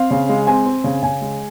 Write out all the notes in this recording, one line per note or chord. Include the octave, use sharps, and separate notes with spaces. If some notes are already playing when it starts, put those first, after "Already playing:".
Already playing: C4 F5
C#3
G#3
C4 G#5
C4
C#3
C#3 G#5
G#3